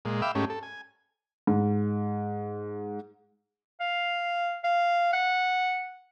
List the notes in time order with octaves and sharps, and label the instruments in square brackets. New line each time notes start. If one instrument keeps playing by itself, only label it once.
[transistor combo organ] A#2 G#3
E5 F5 G5 B5 D6 E6
G#2 A3 C#4 G4
A4
G#5
[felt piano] G#2
[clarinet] F5
F5
F#5